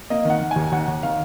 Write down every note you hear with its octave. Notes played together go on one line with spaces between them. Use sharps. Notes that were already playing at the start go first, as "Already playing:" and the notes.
A#3 D#5
D#3 F#5
D#3
D#2 G#5
D#2 F#5
D#2
D#3 F5